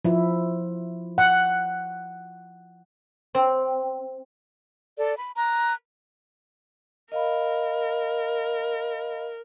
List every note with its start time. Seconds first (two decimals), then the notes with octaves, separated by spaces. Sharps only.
0.05 F3 E4
1.18 F#5
3.35 C4
4.97 A4 D5
5.17 B5
5.37 A#5 F#6
7.12 A#4 D#5 F5 B5